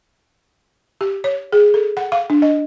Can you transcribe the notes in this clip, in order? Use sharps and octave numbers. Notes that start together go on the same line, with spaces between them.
G4
C#5
G#4
A4
F#5
F5
D4
D#5